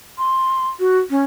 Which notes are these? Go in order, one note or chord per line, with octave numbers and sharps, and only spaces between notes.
C6
F#4
C#4